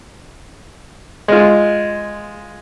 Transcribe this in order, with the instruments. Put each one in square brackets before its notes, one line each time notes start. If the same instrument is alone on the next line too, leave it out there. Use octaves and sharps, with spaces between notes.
[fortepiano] G#3 F4